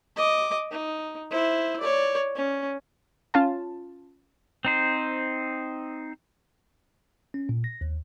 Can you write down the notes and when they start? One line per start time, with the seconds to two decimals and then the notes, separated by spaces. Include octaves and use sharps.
0.16 D#5 D6
0.71 D#4
1.30 E4 C5
1.80 C#5 D5
2.35 C#4
3.34 C#4 F4 A5
4.65 C4 D#4 C5
7.34 C#4
7.49 A#2
7.64 A#6
7.81 D#2